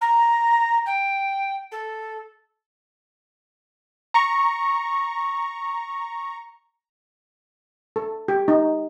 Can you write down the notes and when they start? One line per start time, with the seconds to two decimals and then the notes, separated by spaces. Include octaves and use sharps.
0.01 A#5
0.86 G5
1.71 A4
4.14 A#5 C#6
7.96 A4
8.28 G4
8.48 D#4